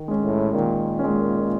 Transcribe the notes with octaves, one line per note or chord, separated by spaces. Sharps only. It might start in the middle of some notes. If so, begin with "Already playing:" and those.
Already playing: D#3
G#3 C#4
A2
A#2 D#3
G#3 C#4